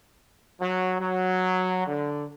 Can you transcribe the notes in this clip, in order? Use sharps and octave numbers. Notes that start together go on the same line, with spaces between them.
F#3
F#3
D3